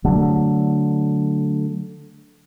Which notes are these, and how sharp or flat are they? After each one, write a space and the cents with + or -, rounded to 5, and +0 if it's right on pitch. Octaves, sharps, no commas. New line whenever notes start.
D3 +0 F#3 +0 A3 +0